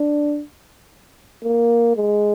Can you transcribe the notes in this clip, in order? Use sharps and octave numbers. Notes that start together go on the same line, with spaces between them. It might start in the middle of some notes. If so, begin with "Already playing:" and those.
Already playing: D4
A#3
G#3